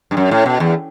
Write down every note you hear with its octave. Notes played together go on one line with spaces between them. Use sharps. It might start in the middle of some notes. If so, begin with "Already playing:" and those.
G2
F#2
A2
B2
E2